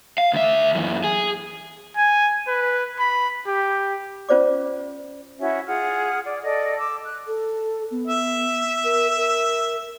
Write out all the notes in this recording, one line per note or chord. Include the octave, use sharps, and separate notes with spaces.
F5
D2 E5
F#2 E3
G#4
G#5
B4
B5
G4
C#4 F4 C5 D5 D6
C#4 E4 F#4 E5
F4 G#4 F#5 F6
D5
A4 D5 D#5
D6 E6
F#6
A4
B3
E5
A#4
A#4